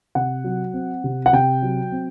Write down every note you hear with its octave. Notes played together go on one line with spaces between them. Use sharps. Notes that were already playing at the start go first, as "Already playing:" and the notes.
C3 F#5
F#3
C4
C3
F#5
C3 G5
F#3
C4